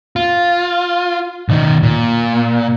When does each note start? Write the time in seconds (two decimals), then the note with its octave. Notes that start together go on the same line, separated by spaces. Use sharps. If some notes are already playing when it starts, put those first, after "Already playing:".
0.16 F4
1.49 B1 D#3
1.83 A#2